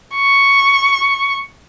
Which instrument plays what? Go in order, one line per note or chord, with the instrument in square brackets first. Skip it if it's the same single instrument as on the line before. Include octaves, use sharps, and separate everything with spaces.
[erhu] C#6